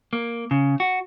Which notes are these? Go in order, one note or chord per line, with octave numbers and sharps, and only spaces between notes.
A#3
C#3
F#4